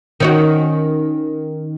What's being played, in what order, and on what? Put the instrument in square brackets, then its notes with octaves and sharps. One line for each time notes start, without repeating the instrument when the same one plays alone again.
[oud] D#3 C#4 F#4